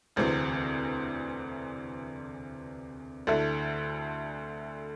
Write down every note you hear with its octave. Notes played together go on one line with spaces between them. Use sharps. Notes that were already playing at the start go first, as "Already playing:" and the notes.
E1 D2 C3 E3 C4
D2 D3 A3 E4 A4